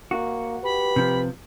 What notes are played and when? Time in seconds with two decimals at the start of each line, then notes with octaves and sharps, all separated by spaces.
0.11 A#3 F#4
0.63 G4 B4 B5
0.96 C3 F3